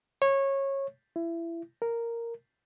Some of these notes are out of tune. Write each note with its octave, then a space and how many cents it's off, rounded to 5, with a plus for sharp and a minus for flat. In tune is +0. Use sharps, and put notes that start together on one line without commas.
C#5 -20
E4 +25
A#4 -5